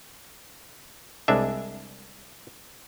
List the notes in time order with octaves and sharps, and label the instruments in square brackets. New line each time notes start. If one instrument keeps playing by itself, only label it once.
[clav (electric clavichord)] C2 G#3 D4 E5